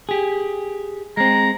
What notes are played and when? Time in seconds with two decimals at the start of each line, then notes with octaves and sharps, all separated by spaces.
0.09 G4 G#4
1.17 G#3 C4 A#5